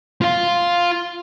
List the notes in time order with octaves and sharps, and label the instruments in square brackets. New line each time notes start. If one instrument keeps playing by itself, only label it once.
[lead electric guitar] F4 F5